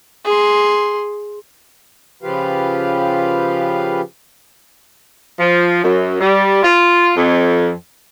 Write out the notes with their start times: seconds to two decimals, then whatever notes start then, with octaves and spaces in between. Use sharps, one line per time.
0.25 G#4 C6
2.23 C#3 F3 F4 G4 B4 F5
5.39 F3
5.84 F#2
6.21 G3
6.63 F4
7.16 F2